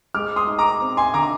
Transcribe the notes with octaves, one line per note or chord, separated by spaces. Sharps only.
G#3 D6 F6
C6 D#6
D#4
A#5 D6
C4
G#5 C6
D3 A#5 D6